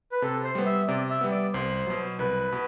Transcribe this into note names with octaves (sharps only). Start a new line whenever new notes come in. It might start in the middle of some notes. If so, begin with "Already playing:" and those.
B4
C3 A4
C5
G3 B3
E5
C3 D5
E5
G3 B3
D5
C2 C5
B2 F#3
C2 B4
B2